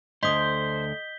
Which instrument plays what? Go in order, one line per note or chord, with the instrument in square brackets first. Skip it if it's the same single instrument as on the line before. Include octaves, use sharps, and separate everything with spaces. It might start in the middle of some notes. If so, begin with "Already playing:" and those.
[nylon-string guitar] D2 D3 [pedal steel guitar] C5 [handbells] D#5 D#6 [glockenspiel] G6 B6 G7